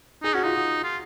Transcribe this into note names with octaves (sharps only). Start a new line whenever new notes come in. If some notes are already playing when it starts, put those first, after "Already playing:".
D#4 G#4
C#4 F#4
D#4 F4
F#4
F4